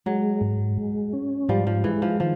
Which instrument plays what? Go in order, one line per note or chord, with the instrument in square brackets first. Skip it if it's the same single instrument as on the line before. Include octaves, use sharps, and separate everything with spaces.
[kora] F#3 [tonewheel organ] G#3
[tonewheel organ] G#2
G#3
C#4
[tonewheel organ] G#2 [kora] F3 G3
[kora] F3
[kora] E3 [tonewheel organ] G#3
[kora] F3
[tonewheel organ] D#3 [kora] F3